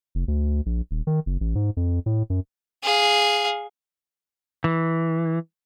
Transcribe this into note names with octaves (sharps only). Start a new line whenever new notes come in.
F1
D2
A#1
D#1
D#3
F#1
A1
G#2
F2
A2
F#2
G#4 F5
E3